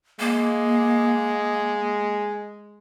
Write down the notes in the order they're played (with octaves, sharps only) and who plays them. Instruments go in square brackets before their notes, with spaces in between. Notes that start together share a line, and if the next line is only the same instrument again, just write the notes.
[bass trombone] G#3 [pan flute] A#3